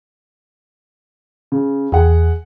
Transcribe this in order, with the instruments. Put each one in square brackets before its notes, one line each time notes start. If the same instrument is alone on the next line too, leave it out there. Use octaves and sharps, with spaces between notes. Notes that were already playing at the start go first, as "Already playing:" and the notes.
[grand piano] C#3
[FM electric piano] E2 [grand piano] G#4 F#5